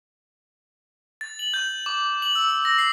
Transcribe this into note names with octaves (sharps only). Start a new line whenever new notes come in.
A6
F#7
G6
D6
F#7
E6
A#6
C7